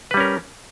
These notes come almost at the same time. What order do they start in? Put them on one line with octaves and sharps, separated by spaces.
B4 G3 C#4 A#4